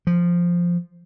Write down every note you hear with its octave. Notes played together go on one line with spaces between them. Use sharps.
F3